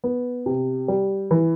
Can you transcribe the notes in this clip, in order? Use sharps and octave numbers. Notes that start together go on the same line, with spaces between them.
B3
C3
G3
E3